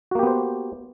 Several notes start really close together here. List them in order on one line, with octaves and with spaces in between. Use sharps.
F#4 A#3 G4 B3 C5